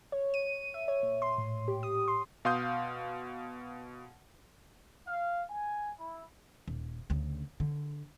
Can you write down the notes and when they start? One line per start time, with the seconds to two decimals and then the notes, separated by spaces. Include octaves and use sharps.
0.12 C#5
0.34 D#7
0.74 E5
0.88 C#5
1.03 A#2
1.22 C6
1.38 A2
1.68 G4
1.83 D#6
2.08 C6
2.45 B2 F5 C6 D#6 G6
5.05 F5
5.47 G#5
5.97 E4
6.68 D#1
7.10 D2 C#3
7.60 D3